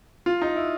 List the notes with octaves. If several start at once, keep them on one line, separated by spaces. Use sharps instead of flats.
F4
D#4
E4